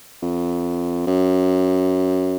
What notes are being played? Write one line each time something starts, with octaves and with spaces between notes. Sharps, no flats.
F2
F#2